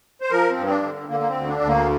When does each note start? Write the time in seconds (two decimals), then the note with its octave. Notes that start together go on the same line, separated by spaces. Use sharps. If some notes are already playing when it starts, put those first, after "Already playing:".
0.21 C5
0.31 F3 A#4
0.51 C4
0.57 G2
0.66 C4
0.70 D4
0.83 D3
1.09 D3 A#3
1.20 A#3
1.28 C4
1.35 D2
1.47 D4
1.61 D2
1.67 A#3